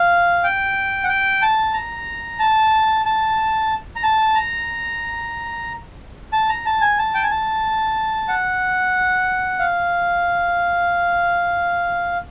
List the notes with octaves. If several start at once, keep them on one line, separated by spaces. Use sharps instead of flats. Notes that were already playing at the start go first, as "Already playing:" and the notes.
Already playing: F5
G5
F#5
G5
A5
A#5
A5
A5
A#5
A5
A#5
A5
A#5
A5
G#5
A5
G5
G#5
A5
F#5
F5